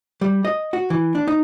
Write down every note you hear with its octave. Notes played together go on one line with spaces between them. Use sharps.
G3
D#5
F#4
E3
D4
D#4